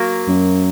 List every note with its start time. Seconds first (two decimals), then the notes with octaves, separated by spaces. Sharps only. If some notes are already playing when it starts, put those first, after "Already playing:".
Already playing: F#3 A#3
0.28 F#2